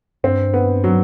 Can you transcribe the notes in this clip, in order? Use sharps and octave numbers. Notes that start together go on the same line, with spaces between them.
G2 C4
B3
F#3